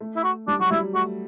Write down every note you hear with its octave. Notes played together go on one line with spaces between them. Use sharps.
A3
E4
F#4
G3 D4
F#3 F#4
G3 E4
A3 F#4